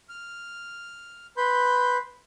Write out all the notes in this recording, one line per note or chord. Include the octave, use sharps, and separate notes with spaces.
F6
B4 B5 C6 G6